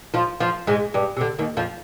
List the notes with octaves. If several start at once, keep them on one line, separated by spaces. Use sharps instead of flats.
F3 F4
F3 F4
G#2 G#3
G2 G3
C3
D3
D#2 D#3
F2 F3